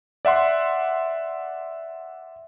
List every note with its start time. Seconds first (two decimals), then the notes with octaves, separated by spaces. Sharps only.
0.25 D5 E5 F#5 C6